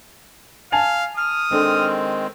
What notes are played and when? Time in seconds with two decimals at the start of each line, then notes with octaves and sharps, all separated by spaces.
0.72 F5 G#5 A5 F7
1.17 D#6 F6
1.51 D#3 G#3 C4 D4 A4